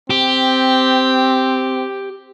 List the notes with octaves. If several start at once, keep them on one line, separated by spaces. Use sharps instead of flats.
C4 G4